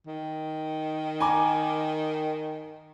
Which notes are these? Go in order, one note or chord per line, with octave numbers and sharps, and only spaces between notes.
D#3
G#5 A#5 D6